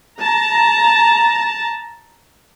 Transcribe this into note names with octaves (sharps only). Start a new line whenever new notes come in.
A5 A#5